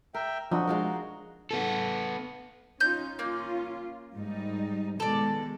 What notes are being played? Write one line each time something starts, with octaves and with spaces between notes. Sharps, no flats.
A#4 E5 G5
F3 D4 D#4 F#4
G#3 F4 A#4
B3 A4
C#4 D#4 F4 G6
A#3 C#4 F4
G#2 G3 D#4
B2 D#3 G#3 A4 D5